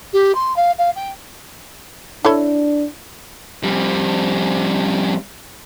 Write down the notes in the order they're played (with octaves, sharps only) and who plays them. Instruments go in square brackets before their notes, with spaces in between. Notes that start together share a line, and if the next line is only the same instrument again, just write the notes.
[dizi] G4
C6
F5
F5
G5
[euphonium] D4 [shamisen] E4 A4 C#5
[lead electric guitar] F2 G3